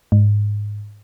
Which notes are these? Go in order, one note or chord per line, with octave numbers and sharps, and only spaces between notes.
G#2